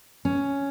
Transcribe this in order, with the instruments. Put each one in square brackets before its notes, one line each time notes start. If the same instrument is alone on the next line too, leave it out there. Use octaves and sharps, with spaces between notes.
[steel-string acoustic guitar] C#4